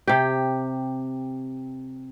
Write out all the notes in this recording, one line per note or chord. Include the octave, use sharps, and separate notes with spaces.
C3 G4